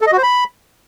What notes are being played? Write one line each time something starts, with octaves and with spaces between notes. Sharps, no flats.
A4
D#5
F#4
C5
B5